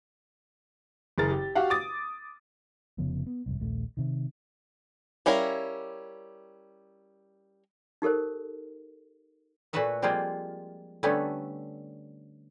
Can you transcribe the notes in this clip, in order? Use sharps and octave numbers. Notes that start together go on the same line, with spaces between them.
F#1 G#4 A#4 A6
G4
F#4 G4 F5 F#5
D6 D#6 A6
F1 C#3 F3 B3
B3
F1 C2
D#1 A#1 A3
C3 D#3
G3 C#4 E4 A#4 F5
D#4 G4 A4 A#4 C5
A#2 A3 F#4 B4 E5 F#5
F3 G3 G#3 A#3 C4 F4
D3 G3 A3 B3 C#4